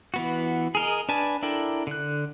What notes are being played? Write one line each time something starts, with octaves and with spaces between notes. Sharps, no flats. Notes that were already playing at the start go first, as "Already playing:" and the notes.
E3 B3 F#4
G#4 A#4 D#5
D4 B4 G#5 A5
D4 E4 A4 A#4 G5
D3 F#6